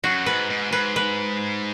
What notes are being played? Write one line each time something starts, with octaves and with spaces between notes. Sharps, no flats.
F#2 F#4
G#2 B4
G#2
G#2 B4
B4